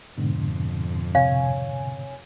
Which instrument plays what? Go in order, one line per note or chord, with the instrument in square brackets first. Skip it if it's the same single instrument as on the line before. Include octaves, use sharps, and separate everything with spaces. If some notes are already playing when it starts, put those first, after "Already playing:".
[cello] F2 [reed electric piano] G#2 B2 D3
[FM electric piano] C3 C#5 G#5 [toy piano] F5